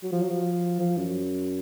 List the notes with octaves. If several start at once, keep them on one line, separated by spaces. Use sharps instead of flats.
F#3
F3
F#3
F3
F3
F#2